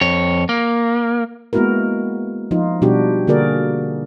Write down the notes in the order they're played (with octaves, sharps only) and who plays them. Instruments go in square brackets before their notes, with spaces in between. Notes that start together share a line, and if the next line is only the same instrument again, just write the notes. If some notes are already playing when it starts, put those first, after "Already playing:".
[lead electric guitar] F2 C#5
A#3
[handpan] G#3 A#3 B3 E4 F#4 A#4
F3 D#4 F4
B2 G3 D4 F#4 G4
D3 A#3 F#4 G#4 A#4 D5